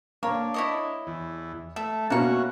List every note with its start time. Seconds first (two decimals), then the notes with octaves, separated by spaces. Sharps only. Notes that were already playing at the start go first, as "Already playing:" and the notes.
0.23 A#3 D4 C#5
0.54 E4 C#5 D#5
1.07 E2
1.76 A3 E5
2.10 B2 A#3 C#4 F#4 E5 C#6